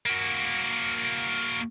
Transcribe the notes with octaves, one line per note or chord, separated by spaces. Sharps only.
A#3 F#4